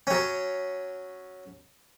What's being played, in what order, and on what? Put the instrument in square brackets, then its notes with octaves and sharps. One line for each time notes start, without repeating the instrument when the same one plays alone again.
[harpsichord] F#3 C#4